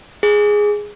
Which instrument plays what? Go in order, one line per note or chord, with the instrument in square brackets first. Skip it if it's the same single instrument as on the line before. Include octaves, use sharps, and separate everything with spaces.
[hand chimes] G#4